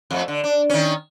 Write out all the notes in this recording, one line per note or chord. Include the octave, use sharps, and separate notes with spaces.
F2 A3
D3
D4
D#3 C#4